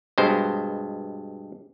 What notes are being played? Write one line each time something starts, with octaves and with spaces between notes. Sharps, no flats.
G2 B2 G#3 C5